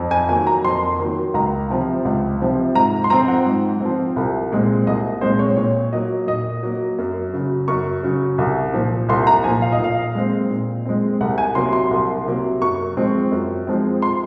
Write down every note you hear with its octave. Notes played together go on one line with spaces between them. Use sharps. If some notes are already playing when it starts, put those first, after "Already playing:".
Already playing: F2
G#5
D#3 F#3 A#3 G#5
A#5
F2 C6
D#3 F#3 A#3
C#2 A#5
C3 F3 C4
C#2
C3 F3 C4
G#2 A#5
C6
F3 C4 A#5
F#5
G#2
F3 C4
C2
A#2 G#3 C4
C2 D#5
A#2 G#3 C4 C5
C#5
A#2 C#5
F#3 A#3 D#5
A#2 D#5
F#3 A#3
F#2
C#3 F#3
F#2 C#6
C#3 F#3
C2
A#2 F3
C2 C6
A#5
A#2 F3 G#5
F5
D#5
A#2 F5
G#3 C4
A#2
G#3 C4
C2 F#5
G#5
C3 F#3 A#3 C6
C6
C2
C3 F#3 A#3
F#2 C#6
F3 G#3 C4
F#2
F3 G#3 C4
C6